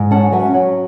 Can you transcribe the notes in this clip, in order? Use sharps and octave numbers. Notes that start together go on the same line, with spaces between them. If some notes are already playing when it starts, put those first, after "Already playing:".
Already playing: G#2
C#4 F#5 A5
F#3 E5 G#5
F#3